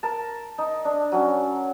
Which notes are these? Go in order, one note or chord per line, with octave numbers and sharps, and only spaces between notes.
A#4 A5
D#4
D4
F#3 C#4